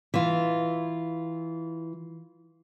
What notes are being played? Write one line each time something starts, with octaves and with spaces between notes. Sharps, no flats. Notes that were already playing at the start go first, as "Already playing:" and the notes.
E3 F4